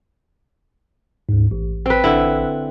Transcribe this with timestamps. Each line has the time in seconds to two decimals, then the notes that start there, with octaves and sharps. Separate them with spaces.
1.29 D2 G#2
1.51 A1
1.86 C4 B4
2.04 D3 E4